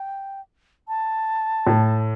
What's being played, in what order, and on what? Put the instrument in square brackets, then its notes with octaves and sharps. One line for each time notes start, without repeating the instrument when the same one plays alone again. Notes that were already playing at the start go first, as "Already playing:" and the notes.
Already playing: [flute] G5
A5
[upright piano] A2